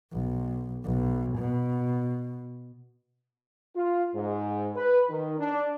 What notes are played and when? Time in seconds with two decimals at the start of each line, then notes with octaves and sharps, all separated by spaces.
0.12 B1
0.85 B1
1.38 B2
3.75 F4
4.14 G#2
4.76 B4
5.10 D#3
5.39 D4